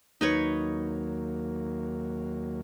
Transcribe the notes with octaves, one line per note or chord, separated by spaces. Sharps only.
D#2 F#3 A#3 D#4 B4 C#5